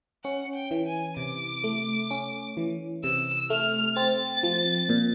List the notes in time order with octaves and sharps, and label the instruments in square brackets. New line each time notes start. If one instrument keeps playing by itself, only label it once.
[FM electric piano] C#4 [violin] F#5
[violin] G5
[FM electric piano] E3
[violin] G#5
[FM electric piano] C3 [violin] D6
[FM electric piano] A3
C#4
E3
[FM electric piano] C3 [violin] E6
[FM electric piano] A3 [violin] F6
[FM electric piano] C4 [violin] A6
[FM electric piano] F3
A#2